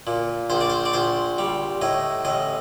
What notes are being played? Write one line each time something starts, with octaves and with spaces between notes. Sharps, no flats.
A#2
A#1 C5
D5
C5
D5
A#1 C5
G3
A2 D#5
A1 D#5